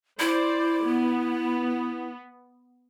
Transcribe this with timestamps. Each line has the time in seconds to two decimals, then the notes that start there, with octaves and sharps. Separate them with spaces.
0.20 E4 C5 D5
0.84 B3